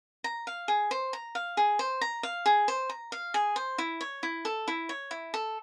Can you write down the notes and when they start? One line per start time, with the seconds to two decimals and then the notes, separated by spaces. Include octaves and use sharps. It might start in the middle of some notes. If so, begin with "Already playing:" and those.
0.24 A#5
0.47 F5
0.68 G#4
0.91 C5
1.13 A#5
1.35 F5
1.57 G#4
1.79 C5
2.01 A#5
2.23 F5
2.46 G#4
2.68 C5
2.89 A#5
3.12 F5
3.34 G#4
3.56 C5
3.78 E4
4.01 C#5
4.23 E4
4.45 A4
4.68 E4
4.89 C#5
5.11 E4
5.34 A4